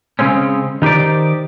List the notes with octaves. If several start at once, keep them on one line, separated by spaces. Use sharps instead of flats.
C#3 G#3 C4 C#4
D#3 D#4 G4 C5 D5